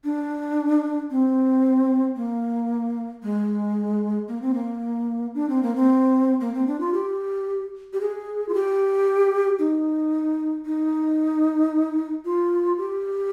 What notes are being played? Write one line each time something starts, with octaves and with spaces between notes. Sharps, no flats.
D4
C4
A#3
G#3
A#3
C4
A#3
D4
C4
A#3
C4
A#3
C4
D4
F4
G4
G4
G#4
F4
G4
D#4
D#4
F4
G4